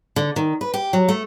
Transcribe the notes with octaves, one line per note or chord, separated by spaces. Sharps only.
D3
D#3
B4
G4
F#3
A3